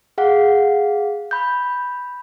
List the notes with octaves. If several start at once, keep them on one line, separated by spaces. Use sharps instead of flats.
G#4 F5 F#5
B5 G6